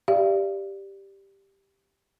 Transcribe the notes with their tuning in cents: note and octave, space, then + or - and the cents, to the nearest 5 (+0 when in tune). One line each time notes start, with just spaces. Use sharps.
G4 +0 D5 +0 F5 -40